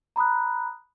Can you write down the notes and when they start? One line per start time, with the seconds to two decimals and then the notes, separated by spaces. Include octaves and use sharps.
0.16 A#5 B5 D#6 F#6